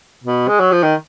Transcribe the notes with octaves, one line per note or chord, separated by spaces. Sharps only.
B2
G#3
F#3
F3
D#3